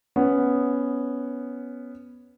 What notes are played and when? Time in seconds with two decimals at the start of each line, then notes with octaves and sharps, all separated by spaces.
0.16 B3 C#4